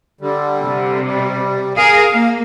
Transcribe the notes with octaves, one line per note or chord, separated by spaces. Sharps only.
D3 G3
C3
G3
G#4 A#4 F5
A#3